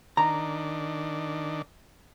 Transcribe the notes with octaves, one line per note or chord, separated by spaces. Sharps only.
D#3 D4 A#5